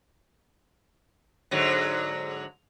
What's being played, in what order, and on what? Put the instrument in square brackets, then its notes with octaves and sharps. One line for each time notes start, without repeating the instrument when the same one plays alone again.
[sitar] G#2 D3 F#3